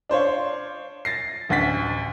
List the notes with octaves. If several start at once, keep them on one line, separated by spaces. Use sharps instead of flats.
D4 C5 C#5 F5
A6 A#6 C7
A1 D2 F#5 A6 B6